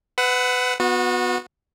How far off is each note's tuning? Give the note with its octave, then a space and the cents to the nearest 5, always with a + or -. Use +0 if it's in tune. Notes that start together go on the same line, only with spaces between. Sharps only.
B4 +25 F#5 +0 E6 -20
B3 +0 F#4 -30